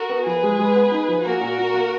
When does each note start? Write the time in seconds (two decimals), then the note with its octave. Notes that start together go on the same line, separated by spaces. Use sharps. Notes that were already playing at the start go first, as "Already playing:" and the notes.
Already playing: F#4 A#4
0.09 B3
0.26 F3 G#4 B4
0.43 G#3
0.59 G#3
0.76 B3
0.92 D#4
1.08 F3
1.24 A#3 F#4 A#4
1.41 A#2
1.58 A#2
1.74 A#3